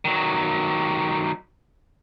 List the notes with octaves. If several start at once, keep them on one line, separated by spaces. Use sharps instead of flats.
D#3 F#3